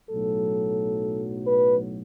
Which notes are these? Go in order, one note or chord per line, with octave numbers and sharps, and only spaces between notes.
B1 A2 F#3 A4
B4